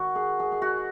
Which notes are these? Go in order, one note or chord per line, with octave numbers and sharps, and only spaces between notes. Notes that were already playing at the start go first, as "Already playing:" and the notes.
Already playing: D#3 F#4
G#4
G#4
G#4
F#4